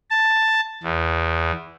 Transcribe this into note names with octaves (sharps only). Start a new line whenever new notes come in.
A5
E2